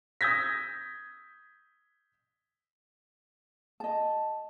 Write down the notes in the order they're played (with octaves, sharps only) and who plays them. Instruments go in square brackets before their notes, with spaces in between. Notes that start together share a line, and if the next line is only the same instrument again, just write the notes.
[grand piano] D#6 E6 G6 G#6 A#6 B6
[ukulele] D#5 A5